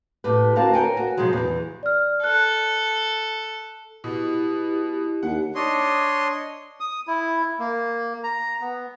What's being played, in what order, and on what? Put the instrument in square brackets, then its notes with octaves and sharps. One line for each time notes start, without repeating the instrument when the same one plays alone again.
[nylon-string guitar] A2 G4 B4
D3 C4 F#4 A#4 F5 A5
A#4 C#5 G5 G#5
F#4
B2 D#3 F3 F#3 G#3
E2 E3
[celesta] D5 F6
[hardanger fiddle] A4 [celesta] F#6
[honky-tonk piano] B2 [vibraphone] E4 [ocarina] G4
[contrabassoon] D#2 [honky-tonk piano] F#5
[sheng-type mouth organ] D4 C#5 D#5 C6
[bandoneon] D#6
E4
A#3
A#5
B3